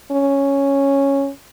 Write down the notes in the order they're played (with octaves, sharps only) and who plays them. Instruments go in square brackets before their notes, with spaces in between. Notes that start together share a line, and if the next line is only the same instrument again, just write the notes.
[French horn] C#4